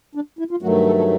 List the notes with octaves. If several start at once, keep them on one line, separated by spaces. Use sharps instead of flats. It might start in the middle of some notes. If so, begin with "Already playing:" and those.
D4
E4
F4
G2 D#3 F#3 A3 F#4
A4
A4